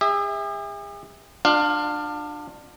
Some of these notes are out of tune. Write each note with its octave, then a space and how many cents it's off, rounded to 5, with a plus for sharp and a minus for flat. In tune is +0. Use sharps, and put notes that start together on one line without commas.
G#4 -45 E5 -15
D4 +25 F4 +35 F5 +0